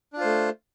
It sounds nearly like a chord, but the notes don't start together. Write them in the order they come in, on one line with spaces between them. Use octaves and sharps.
D4 F4 C5 A3